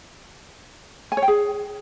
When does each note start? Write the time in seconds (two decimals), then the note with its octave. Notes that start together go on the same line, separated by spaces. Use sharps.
1.12 G#5
1.17 C#5
1.22 G5
1.28 G#4